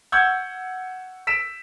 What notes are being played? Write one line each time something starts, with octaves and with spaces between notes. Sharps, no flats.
F#5 C#6 E6 G6 G#6
E6 B6 D7 E7